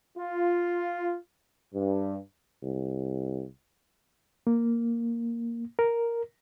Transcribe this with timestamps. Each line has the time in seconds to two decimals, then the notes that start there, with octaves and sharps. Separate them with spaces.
0.18 F4
1.74 G2
2.63 C2
4.47 A#3
5.79 A#4